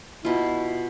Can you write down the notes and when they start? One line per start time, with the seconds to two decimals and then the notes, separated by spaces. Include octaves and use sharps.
0.25 B2 E4 F4